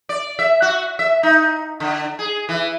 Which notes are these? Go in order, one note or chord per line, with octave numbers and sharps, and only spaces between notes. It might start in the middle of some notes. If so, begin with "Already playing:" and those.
D5
E5
F#4
E5
D#4
D3
G#4
E3